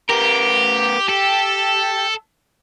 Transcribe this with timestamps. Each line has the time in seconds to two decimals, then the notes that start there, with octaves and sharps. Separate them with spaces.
0.10 B3 G4 A#4
1.09 G4 A4